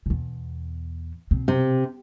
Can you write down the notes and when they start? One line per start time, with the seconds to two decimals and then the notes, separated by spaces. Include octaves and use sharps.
0.06 E2 B2
1.31 B2 C4
1.48 C3